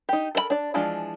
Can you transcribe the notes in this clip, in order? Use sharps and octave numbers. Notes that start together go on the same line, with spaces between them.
D#4 G4
A4 A#4 C5 B5
D4 D5
E3 F3 G#3 D4 F4